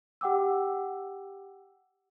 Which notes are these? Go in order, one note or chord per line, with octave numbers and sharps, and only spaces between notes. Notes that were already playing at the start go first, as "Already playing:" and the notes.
G4 F#5 G5 D6 E6